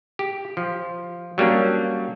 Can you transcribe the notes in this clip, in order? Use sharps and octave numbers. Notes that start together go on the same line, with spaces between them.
G4
F3
F#3 G3 A#3 C#4 D4